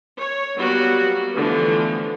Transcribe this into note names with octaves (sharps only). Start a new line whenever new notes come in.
C#5
F#3 G3 A#3 B3 F#4
D3 E3 F3 A3 B3